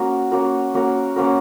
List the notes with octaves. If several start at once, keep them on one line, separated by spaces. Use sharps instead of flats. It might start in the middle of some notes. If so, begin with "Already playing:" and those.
Already playing: A#3 C#4 F#4 A#4
A#3 C#4 F#4 A#4
A#3 C#4 F#4 A#4
A#3 C#4 F#4 A#4